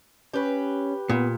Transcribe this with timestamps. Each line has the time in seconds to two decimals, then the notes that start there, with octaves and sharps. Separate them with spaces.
0.33 C#4 G4 B4
1.09 A#2 B3